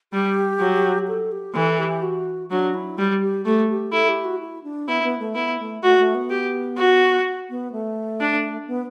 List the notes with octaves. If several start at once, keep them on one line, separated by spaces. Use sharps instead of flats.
G3 G4
F#3
A4
G4
E3 A4
G4
F#4
F#3 D4
E4
G3 G4
G4
A3 G4
G4
E4 A4
G4
F#4
E4
D4
B3 E4
B3
A3
B3 E4
A3
A3 F#4
A3
B3
G4
F#4
B3
A3
D4
B3